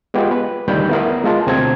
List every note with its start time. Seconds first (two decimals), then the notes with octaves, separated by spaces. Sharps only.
0.14 G#3 B3 F4 G4
0.31 B4
0.68 D2 D#3 G3 B5 G6
0.90 B3 E4 A#4
1.24 G#3 F4 A5
1.46 D2 B2 C4 A5 A#5 G#6